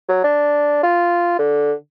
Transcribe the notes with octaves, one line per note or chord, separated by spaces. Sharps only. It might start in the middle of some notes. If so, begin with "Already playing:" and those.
F#3
D4
F4
D3